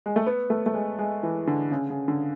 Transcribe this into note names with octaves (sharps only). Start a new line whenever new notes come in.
G#3
A3
B3
A3
A3
G#3
G#3
E3
D3
C#3
C#3
D3